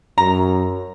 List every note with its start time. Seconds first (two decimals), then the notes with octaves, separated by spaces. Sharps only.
0.18 F#2 A#5